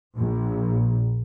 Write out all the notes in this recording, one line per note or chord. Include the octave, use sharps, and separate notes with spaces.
A#1